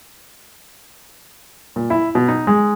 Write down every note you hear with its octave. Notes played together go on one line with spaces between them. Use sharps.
A#2
E4
B2
D#4
G#3